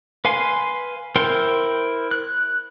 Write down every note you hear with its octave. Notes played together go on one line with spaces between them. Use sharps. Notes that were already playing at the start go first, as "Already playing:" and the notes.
B4 F5 G#5 C6
E4 A#4 C5 G5 C6
F#6